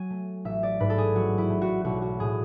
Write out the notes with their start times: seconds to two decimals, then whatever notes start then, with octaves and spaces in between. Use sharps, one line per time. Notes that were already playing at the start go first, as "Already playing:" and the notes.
Already playing: F#3 G#5
0.10 A3
0.45 A1 E5
0.63 D5
0.80 G#2 B4
0.90 A4
0.98 G#4
1.15 F#3 F#4
1.38 E4
1.50 A3
1.62 F#4
1.84 B1 F#4
2.02 F#4
2.19 A2 G#4